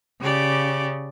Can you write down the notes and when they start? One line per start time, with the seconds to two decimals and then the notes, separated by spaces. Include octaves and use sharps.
0.21 C#3 G4 D5